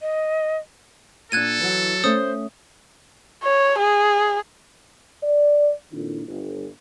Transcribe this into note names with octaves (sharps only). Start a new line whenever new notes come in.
D#5
A#2 D4 A4 F#6 G#6 D#7
E3 F#3 F#4
A3 C#4 C5 D#6
C#5
G#4
D5
F2 A#2 D#3 D4 E4
G1